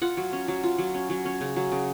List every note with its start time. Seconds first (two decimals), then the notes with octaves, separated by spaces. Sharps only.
0.02 F4 F#5
0.17 F#3
0.33 C#4
0.48 F#3
0.63 F4
0.78 F#3
0.94 C#4
1.10 F#3
1.26 C#4
1.41 C#3
1.56 F#3
1.72 C#3